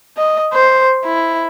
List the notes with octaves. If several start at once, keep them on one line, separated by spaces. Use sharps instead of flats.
D#5
C5
E4